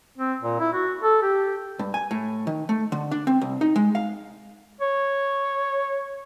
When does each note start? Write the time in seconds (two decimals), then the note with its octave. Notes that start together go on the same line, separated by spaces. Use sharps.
0.18 C4
0.41 A#2
0.60 E4
0.73 F#4
1.03 A4
1.22 G4
1.79 G2
1.94 G#5
2.11 A2
2.47 D#3
2.69 A3
2.92 D3
3.11 D4
3.27 C4
3.41 C2
3.61 D#4
3.76 G#3
3.95 F5
4.81 C#5